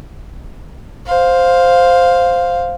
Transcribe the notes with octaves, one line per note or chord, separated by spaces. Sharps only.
C5 F5